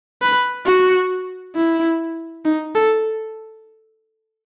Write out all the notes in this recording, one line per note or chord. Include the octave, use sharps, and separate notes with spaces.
B4
F#4
E4
D#4
A4